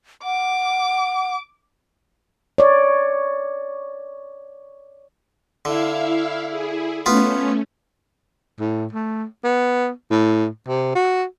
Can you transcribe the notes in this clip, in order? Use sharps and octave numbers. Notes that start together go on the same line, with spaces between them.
F#5 D6
C#5 D5
D3 E4 E5 F5
E4 G#4
A3 B3 C#4 F4
A2
A3
B3
A2
C3
F#4